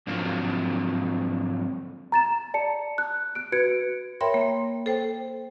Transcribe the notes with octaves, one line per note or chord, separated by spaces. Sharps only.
G#2 D3 F3 F#3 A#3 C4
A#5 A6 E7
D5 A5 C#7
F#6
F#6 D7
F#4 B4 G#6 C#7 D7
A#4 C#5 E5 G5 B5 C6
A#3
A4 C5 G5